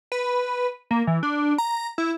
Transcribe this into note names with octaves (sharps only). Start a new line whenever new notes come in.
B4
A#3
E3
D4
A#5
E4